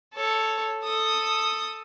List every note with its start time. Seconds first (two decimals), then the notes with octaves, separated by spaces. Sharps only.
0.14 A4 C#5
0.83 A4 D#6